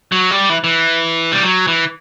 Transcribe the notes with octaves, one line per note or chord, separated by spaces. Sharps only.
F#3
G3
E3
E3
G3
F#3
E3